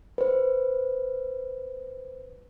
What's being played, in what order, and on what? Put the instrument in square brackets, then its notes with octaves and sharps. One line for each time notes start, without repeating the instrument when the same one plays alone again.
[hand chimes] B4 C5